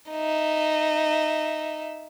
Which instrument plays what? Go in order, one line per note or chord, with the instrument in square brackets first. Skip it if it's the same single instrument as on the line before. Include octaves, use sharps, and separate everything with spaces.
[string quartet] D#4 E5